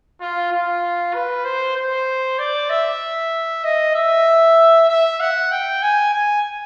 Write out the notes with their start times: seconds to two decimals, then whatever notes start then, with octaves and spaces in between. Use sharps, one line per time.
0.20 F4
0.51 F4
1.14 B4
1.44 C5
1.76 C5
2.39 D5
2.70 E5
3.64 D#5
3.95 E5
4.89 E5
5.20 F#5
5.51 G5
5.82 G#5
6.13 G#5